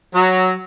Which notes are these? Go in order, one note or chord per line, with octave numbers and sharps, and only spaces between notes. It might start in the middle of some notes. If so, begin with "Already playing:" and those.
F#3